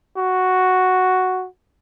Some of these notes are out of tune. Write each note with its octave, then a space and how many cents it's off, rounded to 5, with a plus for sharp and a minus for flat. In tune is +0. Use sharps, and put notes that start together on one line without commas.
F#4 +0